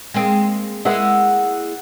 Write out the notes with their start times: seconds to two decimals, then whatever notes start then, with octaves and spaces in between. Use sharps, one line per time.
0.14 G#3 A#3 C4
0.85 G#3 A#3 E4 F#5 E6